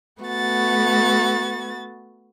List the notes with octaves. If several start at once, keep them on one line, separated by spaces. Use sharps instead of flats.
A3 B3 F#4 A6